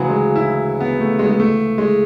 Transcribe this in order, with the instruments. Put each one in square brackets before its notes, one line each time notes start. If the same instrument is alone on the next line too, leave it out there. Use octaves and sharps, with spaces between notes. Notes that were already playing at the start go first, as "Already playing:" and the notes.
Already playing: [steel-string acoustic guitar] D2 C#3 E3 [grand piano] F#3
[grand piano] G#3
E4
B3
A3
G#3
G#3
A3
G#3